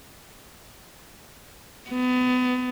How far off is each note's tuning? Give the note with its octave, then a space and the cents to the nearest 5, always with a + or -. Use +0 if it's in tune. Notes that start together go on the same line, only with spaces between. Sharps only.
B3 +30